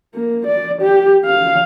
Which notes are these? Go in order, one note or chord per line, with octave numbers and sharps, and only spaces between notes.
A#3
D5
G4
F5